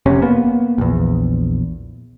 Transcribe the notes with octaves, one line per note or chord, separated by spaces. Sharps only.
F1 C3 C#4
A#3 B3
A#1 E2